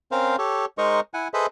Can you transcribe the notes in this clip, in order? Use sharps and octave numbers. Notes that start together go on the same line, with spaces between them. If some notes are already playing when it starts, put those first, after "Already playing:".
C4 C#4 A#4 C5 F5
G4 A4 C#5
G#3 D#4 A#4 C5 D#5 C#6
E4 F#5 G#5
G#4 A4 B4 C5 D#5 E5